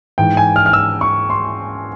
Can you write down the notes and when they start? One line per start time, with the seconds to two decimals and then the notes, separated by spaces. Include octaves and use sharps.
0.18 G#2 E3 G5
0.37 G#5
0.56 F6
0.66 F6
0.73 E6
1.01 C#6
1.30 C6